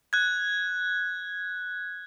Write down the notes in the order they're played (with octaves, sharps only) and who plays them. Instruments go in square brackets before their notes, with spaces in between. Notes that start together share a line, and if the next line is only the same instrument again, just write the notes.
[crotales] F#6 G#6